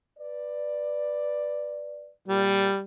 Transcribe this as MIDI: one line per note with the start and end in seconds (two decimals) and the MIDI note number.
0.19 2.11 71
0.19 2.11 74
2.28 2.68 46
2.28 2.84 55